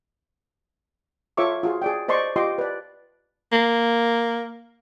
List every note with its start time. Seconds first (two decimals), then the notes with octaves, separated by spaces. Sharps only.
1.37 F4 A4 C#5 E5 C#6 D6
1.63 F4 F#4 G#4
1.82 G#4 D5 G5
2.08 C5 D5 D#5 C6 C#6
2.36 F4 G4 D#5 G5 C6 D6
2.58 B4 D5
3.52 A#3